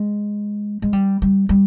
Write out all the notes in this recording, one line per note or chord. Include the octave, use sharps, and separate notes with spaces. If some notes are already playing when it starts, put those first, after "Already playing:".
Already playing: G#3
G#3
G3
G3
G3